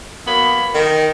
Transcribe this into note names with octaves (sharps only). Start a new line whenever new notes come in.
F#3 A#3 B3 B5
D#3